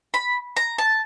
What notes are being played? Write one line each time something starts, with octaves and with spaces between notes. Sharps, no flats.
B5
A#5
A5